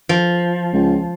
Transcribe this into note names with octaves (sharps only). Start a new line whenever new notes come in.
F3
C#2